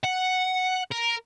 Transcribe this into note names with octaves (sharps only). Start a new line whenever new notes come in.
F#5
A#4